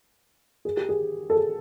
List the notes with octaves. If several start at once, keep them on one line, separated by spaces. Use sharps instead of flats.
G#4
G4
G#4
A4
G#4